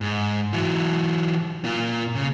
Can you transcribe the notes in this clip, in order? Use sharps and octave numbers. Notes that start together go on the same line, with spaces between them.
G#2
E3 F#3
A#2 F4
C#3